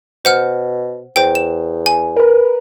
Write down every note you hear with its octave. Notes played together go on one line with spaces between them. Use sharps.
B2 C5 F#5 F6
E2 C5 G5
E7
G#5
A#4 B4